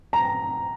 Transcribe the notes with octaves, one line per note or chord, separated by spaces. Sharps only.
A#5